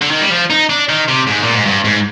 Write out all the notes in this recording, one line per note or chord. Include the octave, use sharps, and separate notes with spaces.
D3
D#3
G3
F3
D#4
D4
D#3
C3
G#2
A#2
G#2
G2
G#2